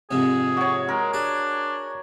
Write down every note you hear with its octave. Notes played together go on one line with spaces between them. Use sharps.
F2 G#2 C3 G#4
F#4 C#5
G#3 A#4
D4 G#4